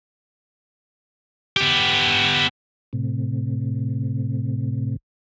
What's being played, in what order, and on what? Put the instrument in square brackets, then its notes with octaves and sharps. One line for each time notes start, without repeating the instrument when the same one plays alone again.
[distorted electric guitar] B3 G4
[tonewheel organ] A2 C3